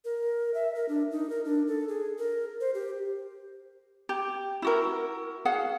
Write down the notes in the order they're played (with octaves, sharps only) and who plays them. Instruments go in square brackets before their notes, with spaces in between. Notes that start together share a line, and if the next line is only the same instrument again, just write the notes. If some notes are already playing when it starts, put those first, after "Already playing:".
[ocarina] A#4
E5
A#4
D4
D#4
A#4
D4
A4
G#4
A#4
C5
G4
[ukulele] G4
E4 F#4 A#4
G#4 F5 F#5